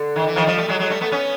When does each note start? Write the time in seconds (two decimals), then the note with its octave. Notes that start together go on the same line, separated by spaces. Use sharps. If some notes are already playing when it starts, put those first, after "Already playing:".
Already playing: D3
0.16 D#3
0.27 E3
0.36 D#3 F3
0.47 F3 G3
0.57 G3 A3
0.68 F#3 G#3
0.79 F#3 G#3
0.90 G3 A3
1.01 A3 B3
1.12 B3 C#4